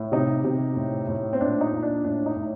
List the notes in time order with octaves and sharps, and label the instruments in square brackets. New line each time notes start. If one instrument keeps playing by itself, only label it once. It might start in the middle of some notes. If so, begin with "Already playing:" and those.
Already playing: [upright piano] A2
C3 D#4
C3
A2
A2
C4
A#2 D4
D#4
A#2
D4
A2 D4
D#4
A2